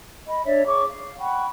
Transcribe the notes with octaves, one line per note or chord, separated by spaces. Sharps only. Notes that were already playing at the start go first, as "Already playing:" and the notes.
D#5 B5
D4 C#5 D5 E5
G#4 C#5 C#6 D6
F5
F#5 G5 B5 C#6